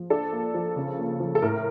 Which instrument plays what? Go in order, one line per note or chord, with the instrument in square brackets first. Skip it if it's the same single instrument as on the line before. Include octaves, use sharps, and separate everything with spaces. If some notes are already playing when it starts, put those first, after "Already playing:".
Already playing: [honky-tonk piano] F3
D4 A4
A#3
F3
C#3
A#3
F3
A4
A2 A#4